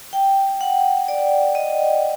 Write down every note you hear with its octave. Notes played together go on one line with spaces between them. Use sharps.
G5
F#5
D5
D#5